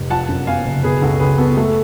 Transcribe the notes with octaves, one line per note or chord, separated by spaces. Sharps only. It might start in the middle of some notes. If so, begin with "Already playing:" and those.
Already playing: F1
F3 F#5 A5
F#2
B3 F5 G#5
F#1
B2 G#4 B4
C#2 F#4 A4
C#2 G#4 B4
B3 F#4 A4
A3 F#4 A4